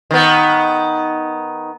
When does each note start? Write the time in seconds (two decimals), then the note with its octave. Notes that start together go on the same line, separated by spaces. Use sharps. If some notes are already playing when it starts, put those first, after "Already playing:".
0.11 D#3 B3